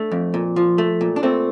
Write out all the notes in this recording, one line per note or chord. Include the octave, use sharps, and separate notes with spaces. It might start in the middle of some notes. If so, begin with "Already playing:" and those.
Already playing: A3 D4
F2
A#2
F3
A3
A#2
D4
A#2 A3 C4